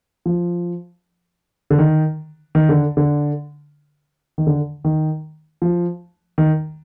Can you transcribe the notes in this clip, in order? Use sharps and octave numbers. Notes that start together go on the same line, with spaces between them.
F3
D3
D#3
D#3
D3
D3
D#3
D3
D#3
F3
D#3